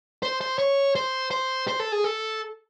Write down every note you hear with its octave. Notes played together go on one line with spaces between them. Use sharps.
C5
C5
C#5
C5
C5
C5
A4
G#4
A4